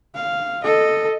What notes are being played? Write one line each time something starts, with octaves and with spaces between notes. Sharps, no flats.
F5
A4 D#5